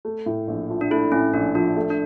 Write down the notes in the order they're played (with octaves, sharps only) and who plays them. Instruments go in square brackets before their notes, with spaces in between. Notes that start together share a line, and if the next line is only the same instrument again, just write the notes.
[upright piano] A3
A2
A#1
F3
[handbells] D4
[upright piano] A3 [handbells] E4
[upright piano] A2 [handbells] C#4
[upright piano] A#1 [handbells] D4
[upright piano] F3 [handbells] D4
[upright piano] A3
[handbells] D4